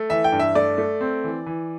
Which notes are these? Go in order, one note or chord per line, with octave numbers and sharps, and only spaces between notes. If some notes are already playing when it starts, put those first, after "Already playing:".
Already playing: A3
E3 E5
G5
G2
E5
A3 D5
A3
C4
E3
E3